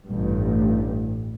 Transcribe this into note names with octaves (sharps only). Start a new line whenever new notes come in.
A1 G2